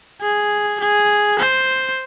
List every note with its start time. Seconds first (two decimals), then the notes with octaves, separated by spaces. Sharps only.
0.22 G#4
0.80 G#4
1.39 C5